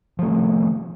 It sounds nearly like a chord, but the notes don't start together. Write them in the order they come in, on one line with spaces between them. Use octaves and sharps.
F3 A3 C3 D#3